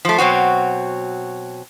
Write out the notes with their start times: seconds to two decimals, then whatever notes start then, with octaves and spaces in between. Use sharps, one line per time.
0.05 F3 A3
0.18 B2 F#3 C4 F#4